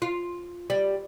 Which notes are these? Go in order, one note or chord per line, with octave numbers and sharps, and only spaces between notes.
F4
G3